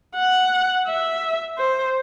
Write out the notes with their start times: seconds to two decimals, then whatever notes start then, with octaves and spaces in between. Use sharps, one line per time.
0.16 F#5
0.88 E5
1.58 C5